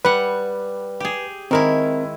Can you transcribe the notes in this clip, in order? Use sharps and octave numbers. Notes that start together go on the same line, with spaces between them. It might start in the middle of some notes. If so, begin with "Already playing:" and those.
G3 B4 F#5
G4 G#4
D#3 G#3 C4 E4 A#4